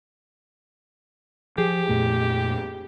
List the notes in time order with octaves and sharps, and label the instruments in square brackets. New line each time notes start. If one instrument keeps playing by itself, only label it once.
[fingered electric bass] F3 [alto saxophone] G4 [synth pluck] G#4
[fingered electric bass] F2 A#2 A3